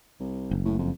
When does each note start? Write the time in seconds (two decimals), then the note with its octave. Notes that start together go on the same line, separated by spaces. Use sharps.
0.20 C2
0.51 F#1
0.65 A2
0.79 F2